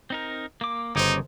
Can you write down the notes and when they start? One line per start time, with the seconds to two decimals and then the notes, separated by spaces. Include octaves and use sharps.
0.10 C4 D#4 A#4
0.61 A#3 D6
0.96 G1 C#3 D#4 C5 C#5 D6